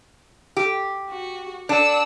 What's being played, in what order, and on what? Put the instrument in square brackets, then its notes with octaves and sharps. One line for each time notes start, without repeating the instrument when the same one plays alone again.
[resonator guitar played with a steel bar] G4
[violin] F#4
[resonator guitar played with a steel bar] D4 [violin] F#5 E6